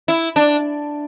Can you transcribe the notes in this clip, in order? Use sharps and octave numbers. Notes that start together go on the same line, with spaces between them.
E4
D4